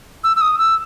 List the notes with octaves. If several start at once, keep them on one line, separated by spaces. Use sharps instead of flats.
E6
E6
D#6
E6